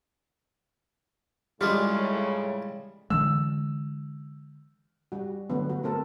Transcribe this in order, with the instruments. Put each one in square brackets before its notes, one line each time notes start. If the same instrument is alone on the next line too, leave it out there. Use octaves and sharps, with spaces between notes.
[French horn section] A2 C#3 [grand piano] G3 [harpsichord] G#3 D4 F4
[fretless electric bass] D3 E3 G#3 [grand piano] E6
[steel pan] G3 F#4
D3 F#3 A3 B3
F#4
A3 C4 A4 A#4